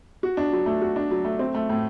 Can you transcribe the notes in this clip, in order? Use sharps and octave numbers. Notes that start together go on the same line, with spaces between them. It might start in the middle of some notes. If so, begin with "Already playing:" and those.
F#4
D4
F#3
A3
F#4
D4
F#3
A3
C4
A3
A2